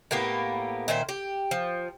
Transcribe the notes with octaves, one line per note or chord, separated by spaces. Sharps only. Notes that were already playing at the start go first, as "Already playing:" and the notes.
A2 A#3 B3 G4
A#2 D#3 E4 C5
G4
F3